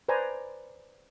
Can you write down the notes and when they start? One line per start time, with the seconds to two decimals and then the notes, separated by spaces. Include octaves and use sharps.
0.08 B4 C5 D5 G#5 A#5